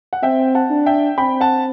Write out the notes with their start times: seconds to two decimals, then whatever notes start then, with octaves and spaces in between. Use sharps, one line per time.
0.13 F#5
0.23 C4 E5 G5
0.55 F#5 A5
0.71 D4
0.86 E5 G5
1.18 C4 G5 B5
1.41 F#5 A5